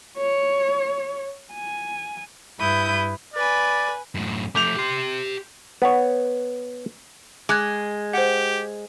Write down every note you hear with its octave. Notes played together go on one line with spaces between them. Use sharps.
C#5
G#5
G2 E4 B4 D#6 G6
B4 D5 G#5 B5
F#2 A2
F3 A3 D6 G6 F7
G4 C6
B3 B4 C#5
G#3 D6 F#6 G#6
G4 C5 F#5